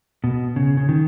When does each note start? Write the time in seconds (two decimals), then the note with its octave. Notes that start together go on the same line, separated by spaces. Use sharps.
0.24 B2
0.56 C#3
0.77 C#3
0.89 D#3